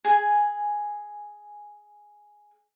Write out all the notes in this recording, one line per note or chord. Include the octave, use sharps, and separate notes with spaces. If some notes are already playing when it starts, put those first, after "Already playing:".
G#4 G#5